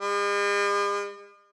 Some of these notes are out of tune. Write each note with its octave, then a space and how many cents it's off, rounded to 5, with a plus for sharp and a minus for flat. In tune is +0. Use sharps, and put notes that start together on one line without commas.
G#3 -45